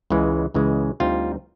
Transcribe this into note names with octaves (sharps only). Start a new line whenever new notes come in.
C#2 C#3 E3 G#3
C#2 C#3 E3 G#3
D2 D3 G3 C4 D#4 F4